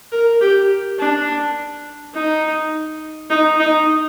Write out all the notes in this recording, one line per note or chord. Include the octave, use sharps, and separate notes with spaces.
A#4
G4
D4
D#4
D#4
D#4